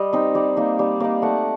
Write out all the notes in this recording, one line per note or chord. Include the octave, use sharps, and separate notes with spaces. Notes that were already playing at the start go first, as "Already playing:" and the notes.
Already playing: G3 D#5
C4 D#4
G3 D5
A#3 D#4
G3 D5
A#3 D#4 D5
A3 F#5